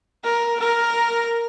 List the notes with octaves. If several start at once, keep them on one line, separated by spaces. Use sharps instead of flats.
A#4
A#4